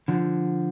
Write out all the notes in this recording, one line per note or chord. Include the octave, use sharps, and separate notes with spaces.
D3 F3